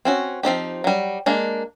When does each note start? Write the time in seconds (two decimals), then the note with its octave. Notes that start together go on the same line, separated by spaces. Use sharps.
0.05 C4 C#4 F#4
0.43 F3 C4 D#4 G4
0.84 F#3 G3
1.26 G#3 A#3 D4